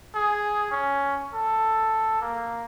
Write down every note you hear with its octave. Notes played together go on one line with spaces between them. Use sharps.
G#4
C#4
A4
A#3